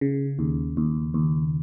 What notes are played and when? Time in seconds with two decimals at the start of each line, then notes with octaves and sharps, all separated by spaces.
0.01 C#3
0.39 D#2
0.77 D#2
1.14 D#2